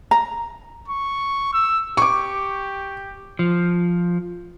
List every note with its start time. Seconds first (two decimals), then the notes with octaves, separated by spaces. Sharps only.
0.11 A#5
0.88 C#6
1.54 E6
1.97 G4 C#6 D6
3.39 F3